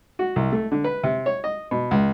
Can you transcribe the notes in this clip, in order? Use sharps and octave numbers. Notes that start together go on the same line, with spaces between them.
F#4
C2
A3
D3
B4
C3
C#5
D#5
B2
C#2